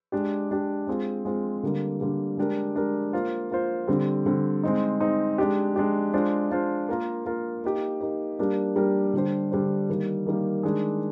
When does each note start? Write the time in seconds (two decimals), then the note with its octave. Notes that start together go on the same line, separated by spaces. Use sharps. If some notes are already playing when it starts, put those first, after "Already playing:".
0.12 G#3 D4 G4
0.51 G#3 D4 G4
0.87 G#3 C4 F4 G#4
1.25 G#3 C4 F4 G#4
1.63 D3 G3 A#3
2.00 D3 G3 A#3
2.37 G#3 D4 G4 A#4
2.75 G#3 D4 G4 A#4
3.13 A#3 F4 C5
3.50 A#3 F4 C5
3.88 D3 G3 C4
4.26 D3 G3 C4
4.63 G#3 C4 D#4
5.00 G#3 C4 D#4
5.38 G#3 D4 G4
5.76 G#3 D4 G4
6.14 G#3 D4 F4 C5
6.51 G#3 D4 F4 C5
6.89 A#3 F4 A#4
7.25 A#3 F4 A#4
7.64 A#3 D#4 G4
8.01 A#3 D#4 G4
8.39 G3 A#3 D4 G4 A#4
8.76 G3 A#3 D4 G4 A#4
9.14 D3 G3 D4 G4 C5
9.51 D3 G3 D4 G4 C5
9.89 D#3 G3 A#3
10.26 D#3 G3 A#3
10.63 D#3 G#3 D4 G#4